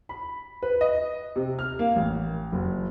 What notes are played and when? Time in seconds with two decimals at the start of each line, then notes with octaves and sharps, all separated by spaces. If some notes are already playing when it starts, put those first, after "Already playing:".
0.09 B5
0.63 B4
0.81 D#5
1.36 C3
1.59 F6
1.79 A#3
1.96 A1
2.52 F#1